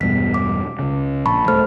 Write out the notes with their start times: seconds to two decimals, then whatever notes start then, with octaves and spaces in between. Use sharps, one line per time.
0.01 E1 G2 B2 B6
0.34 D6
0.79 C#2 C#3
1.26 A#1 A5 B5 C#6
1.48 D#1 E2 A3 A4 C5 F6